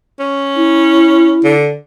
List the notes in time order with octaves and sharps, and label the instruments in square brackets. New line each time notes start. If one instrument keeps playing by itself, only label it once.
[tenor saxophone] C#4
[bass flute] E4
[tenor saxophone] D3